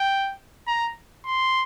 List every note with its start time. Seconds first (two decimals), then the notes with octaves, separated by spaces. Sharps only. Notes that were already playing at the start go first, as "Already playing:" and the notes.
Already playing: G5
0.67 A#5
1.25 C6